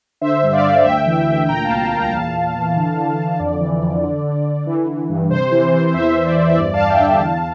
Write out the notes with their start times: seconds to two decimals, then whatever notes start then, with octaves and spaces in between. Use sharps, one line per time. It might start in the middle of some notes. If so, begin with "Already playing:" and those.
0.21 D3 C5 E5
0.43 G2
0.53 D5 F5
0.64 D3
0.85 D2 E5 G5
1.06 E3
1.27 D2
1.49 A#2 G5 A#5
1.65 F5 A5
1.70 C2
1.76 G5
1.81 F5 A5
1.91 A#2
1.96 G5 A#5
2.12 E2 F5 A5
2.34 E2
2.55 E3
2.76 D3
2.97 D3
3.18 D3
3.39 F2 D5
3.61 E3
3.82 F2
4.03 D3
4.24 D3
4.46 D3
4.66 E3
4.88 E3
5.09 G2
5.30 C3 C5
5.51 E3
5.73 E3
5.94 E2 C5 E5
6.15 E2
6.26 D5
6.37 E2
6.49 E5
6.58 G2 D5
6.74 F5 A5
6.79 G2
6.90 E5 G5
7.00 D3
7.05 F5 A5
7.21 E2